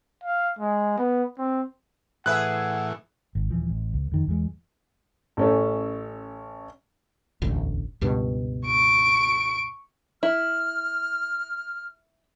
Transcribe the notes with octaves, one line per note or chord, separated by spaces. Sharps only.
F5
G#3
B3
C4
A2 E3 G#4 B4 E5 F#5 F#6
G#1
D#1 E3 F3
A1
C#2
F2 D#3
E2 E3 G#3
A1 C#4 A4
E1 A1 D2
C#2 G2 B2
C#6 D7
E4 F6